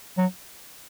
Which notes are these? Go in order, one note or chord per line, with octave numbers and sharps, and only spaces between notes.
F#3